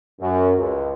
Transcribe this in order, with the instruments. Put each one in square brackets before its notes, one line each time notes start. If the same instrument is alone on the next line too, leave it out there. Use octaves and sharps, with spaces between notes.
[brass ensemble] F#2
C#2